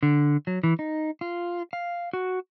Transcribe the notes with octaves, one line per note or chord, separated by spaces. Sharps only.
D3
F#3
E3
D#4
F4
F5
F#4